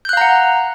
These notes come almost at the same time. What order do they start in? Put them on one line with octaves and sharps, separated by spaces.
G6 F#6 F5 A#5 F#5